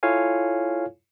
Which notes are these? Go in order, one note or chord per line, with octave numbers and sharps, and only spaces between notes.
E4 F4 A4 C#5 F5 G#5